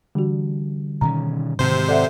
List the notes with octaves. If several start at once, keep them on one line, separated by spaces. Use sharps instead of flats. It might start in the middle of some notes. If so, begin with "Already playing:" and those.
D3 E3 G3 F#4
B2 D#3 C#4 A#5
G#2 C3 D#3 C5
A4 D5 E5 F#5